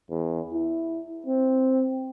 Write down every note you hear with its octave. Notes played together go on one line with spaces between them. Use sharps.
E2
E4
C4